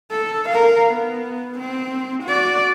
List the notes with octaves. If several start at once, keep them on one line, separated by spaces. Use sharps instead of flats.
A4
A#4 F5
B3
C4
F#4 D5